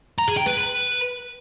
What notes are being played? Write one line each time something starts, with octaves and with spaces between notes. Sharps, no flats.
A#5
G#4
G5
B4